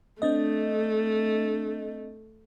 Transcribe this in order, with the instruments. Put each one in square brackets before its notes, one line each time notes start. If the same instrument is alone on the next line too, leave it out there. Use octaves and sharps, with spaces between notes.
[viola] A3 [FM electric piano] C4 D4 D#5